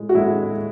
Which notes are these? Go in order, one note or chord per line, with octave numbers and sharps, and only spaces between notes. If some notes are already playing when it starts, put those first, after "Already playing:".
Already playing: A2 G#3
F#4
A2 G#3 E4